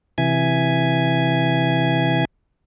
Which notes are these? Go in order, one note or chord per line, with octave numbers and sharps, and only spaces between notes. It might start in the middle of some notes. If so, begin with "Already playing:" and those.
C3 E3 E5 G#5 G#6